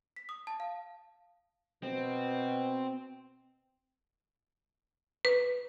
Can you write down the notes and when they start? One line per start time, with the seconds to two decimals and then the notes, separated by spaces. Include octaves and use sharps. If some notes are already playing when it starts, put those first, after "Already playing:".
0.16 B6
0.29 D#6
0.47 A5
0.60 F5
1.83 B2 C4
5.25 B4